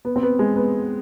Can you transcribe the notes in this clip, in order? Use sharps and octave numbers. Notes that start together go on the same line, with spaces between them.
B3
C4
B3
G#3
B3